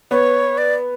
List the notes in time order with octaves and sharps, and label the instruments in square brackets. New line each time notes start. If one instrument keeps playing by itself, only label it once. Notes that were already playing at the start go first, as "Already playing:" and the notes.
[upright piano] B3 [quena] C#5
[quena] D5